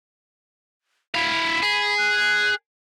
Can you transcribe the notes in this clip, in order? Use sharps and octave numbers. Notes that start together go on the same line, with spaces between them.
E4 F5 B5
G#4
F#6